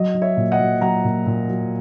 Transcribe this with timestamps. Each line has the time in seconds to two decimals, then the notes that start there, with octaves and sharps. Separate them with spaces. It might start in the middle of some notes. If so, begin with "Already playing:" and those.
Already playing: F#3 D#5
0.14 F#3
0.22 C#5 E5
0.37 A#2
0.52 D#5 F#5
0.60 F#3
0.81 F#3 F#5 A#5
1.04 A#2
1.26 A#2
1.48 F#3